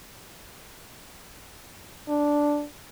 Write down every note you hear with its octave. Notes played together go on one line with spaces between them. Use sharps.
D4